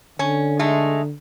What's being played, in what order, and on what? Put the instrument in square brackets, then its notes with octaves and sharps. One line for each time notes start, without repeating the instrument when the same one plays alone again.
[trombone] D3 [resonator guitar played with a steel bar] C#4
[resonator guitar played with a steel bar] G#3 A3 D#4